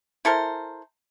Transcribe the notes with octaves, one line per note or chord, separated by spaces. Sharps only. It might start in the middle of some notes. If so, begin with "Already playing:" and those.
E4 A4 A#4 C5